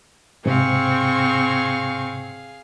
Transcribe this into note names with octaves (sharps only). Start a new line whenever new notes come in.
G#2 C3 C4 G#4 F5 C#6